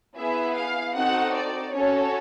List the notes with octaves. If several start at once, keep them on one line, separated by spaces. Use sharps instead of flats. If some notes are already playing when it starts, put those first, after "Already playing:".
B3 E4 G#4 E5
F5
C4 D#4 F#4 A4 F#5
D5
C#4 F#4 A4 C#5